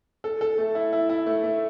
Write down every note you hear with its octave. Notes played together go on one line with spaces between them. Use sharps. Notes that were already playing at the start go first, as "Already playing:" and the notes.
A4
A4
A3
E4
E4
E4
A3
A3